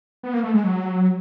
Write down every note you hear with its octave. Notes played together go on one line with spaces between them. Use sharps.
B3
A#3
A3
G#3
F#3